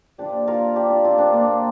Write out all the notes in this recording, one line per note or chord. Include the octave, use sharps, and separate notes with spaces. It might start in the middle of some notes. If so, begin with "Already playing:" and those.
A#2 F3 D4 G4
F4 A#4
D4 G4
C4 F4
C4 F4
A#3 D4
A#2 F3 A#3